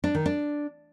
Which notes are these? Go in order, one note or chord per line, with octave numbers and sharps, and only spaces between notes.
D4
D#3
D4